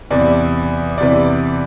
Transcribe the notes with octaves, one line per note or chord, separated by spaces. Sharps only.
E2 C3 E3 D5
E2 C3 E3 D5